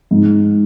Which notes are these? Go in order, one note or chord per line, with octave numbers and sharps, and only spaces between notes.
G#2